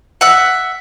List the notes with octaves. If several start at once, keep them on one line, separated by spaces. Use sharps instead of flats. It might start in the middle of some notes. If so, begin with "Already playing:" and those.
E5 F#5